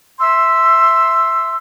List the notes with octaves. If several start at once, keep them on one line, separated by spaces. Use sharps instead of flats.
E5 C6 E6